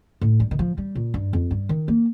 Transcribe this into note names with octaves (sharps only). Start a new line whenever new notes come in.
A2
G2
D#3
F3
G3
A#2
G2
F2
G2
D#3
A#3